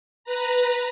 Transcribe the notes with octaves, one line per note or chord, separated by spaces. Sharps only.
B4 A#5